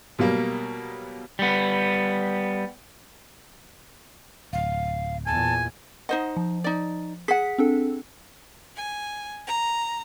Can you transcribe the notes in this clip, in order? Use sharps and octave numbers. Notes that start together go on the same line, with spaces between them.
B2 F#3 G3 A#3
G3 B3
D1 F5
E2 A#2 G#5 A5
D#4 C5 D#5 F#5
F3
D#4 D5
G#4 F#5 B6
C4 D4 A4
G#5
A#5